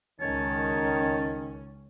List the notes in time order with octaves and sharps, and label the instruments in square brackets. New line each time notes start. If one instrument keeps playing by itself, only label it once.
[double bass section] C#2 C#4 [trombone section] D#3 [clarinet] C#5 [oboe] A5